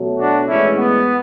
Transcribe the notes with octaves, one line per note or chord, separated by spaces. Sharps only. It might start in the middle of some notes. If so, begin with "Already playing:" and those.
Already playing: B2 F#3 A3
D4 F#4
A2 E3 G#3 C#4 E4
B3